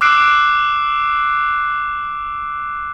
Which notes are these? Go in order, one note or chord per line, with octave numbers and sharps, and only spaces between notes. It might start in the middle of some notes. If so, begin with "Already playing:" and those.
D6 E6 F#6 C7 D7 E7